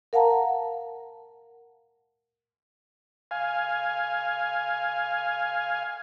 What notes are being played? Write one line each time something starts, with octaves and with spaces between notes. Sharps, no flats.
A#4 F5 F#5 A5 A#5
F5 G#5